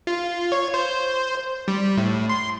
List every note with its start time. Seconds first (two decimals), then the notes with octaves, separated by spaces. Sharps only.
0.07 F4
0.52 C#5
0.74 C5
1.68 G3
1.98 A2
2.29 C6